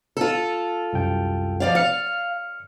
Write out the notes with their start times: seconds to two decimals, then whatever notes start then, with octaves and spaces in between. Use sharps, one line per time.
0.17 F4 A4
0.93 C2 F#2 G5
1.60 F3 D5 F5
1.75 F5 F6 C#7